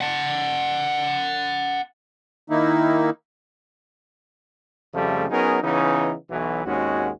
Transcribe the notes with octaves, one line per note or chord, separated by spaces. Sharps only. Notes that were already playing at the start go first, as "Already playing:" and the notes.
F#5 A5
D#3 A#3 D#4 E4
F2 C#3 F3 G3 A3
F#3 B3 C#4 D#4 G#4 A#4
C#3 E3 B3 C#4 D#4
B1 E3 F#3
G#1 D#2 G#3 C#4 F#4